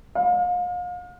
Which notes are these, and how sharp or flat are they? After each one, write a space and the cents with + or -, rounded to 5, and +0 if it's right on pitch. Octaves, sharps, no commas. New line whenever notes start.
F5 +35